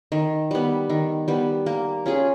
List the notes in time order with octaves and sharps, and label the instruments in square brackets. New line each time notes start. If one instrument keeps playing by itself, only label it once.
[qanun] D#3
G3 B3
D#3
G3 B3
A#3
C#4 F4 G#4